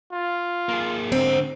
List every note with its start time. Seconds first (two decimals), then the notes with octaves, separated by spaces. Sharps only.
0.13 F4
0.69 A#3 G#4
1.12 G#2 D3 C4